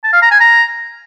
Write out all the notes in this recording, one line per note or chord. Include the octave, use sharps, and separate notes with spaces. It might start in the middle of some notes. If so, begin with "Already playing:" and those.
A5
F5
A#5
G#5
A#5